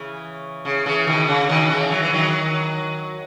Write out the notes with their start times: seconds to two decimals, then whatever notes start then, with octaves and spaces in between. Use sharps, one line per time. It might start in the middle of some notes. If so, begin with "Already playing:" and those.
Already playing: C#3 E3
0.65 C#3
0.86 C#3 E3
1.07 B2 D#3
1.28 C#3
1.49 B2 D#3
1.70 C#3 E3
1.91 F#3
2.02 E3
2.13 D#3 F#3